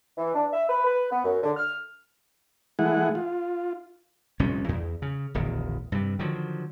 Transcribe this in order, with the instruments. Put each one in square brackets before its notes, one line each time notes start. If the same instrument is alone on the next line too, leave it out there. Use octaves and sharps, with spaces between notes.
[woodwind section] E3
D4
E5
B4
B4
B3
F#2
D3
F6
[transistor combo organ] E3 G#3 A3 E4 G#4 F#5
F4
[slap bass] F1 C2 A#2 C#4
E2
C#3
D1 A#1 E2 D#3
G2 C3
D3 D#3 F3 F#3